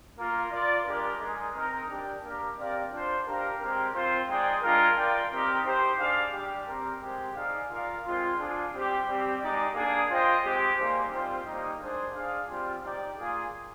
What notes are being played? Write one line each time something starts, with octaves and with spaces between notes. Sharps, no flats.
A#3 F4 A#4
F4 A#4 D5
G#3 D4 G4 A#4
G#3 D#4 G#4
C4 D#4 A#4
D4 G4 D5 G5
A#3 D4 G4 A#4
C4 G4 A#4 D5 F5
D4 F4 C5
D4 G4 A#4 F5
G#3 C4 G4 A#4
C4 F4 C5
G#3 D#4 G#4 D5 G5
G#3 D4 F4 A#4
F4 A#4 D5 G5
C4 D#4 G4 A#4
D#4 G4 C5
D4 G#4 D5 F5
G3 D4 G4
C4 G4 A#4
G#3 C4 G4
D#4 G#4 D5 F5
F4 A#4 D5 F5
G#3 C4 F4
D4 F4 G#4
G3 C4 G4
G3 C4 G4
G#3 D#4 G4 D5
A#3 D4 G#4
F4 C5 D#5 G5
G#3 C4 G4
G3 A#3 D#4 G#4 C5
G3 C4 F4 C5 G5
G3 A#3 D#4
G#3 D4 G#4 C5
D4 G#4 D5 F5
G3 C4 F4
D#4 G4 D5 G5
A#3 F4 G#4